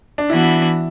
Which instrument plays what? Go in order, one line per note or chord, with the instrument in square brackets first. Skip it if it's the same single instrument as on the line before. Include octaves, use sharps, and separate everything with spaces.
[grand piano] D4
[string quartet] E3 B3 D4 F#4 [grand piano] E4